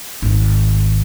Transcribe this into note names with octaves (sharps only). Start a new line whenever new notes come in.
G#1 D#3